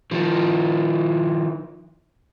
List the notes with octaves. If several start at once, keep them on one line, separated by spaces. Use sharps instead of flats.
D#3 F3